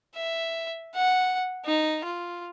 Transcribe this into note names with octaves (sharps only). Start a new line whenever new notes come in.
E5
F#5
D#4
F4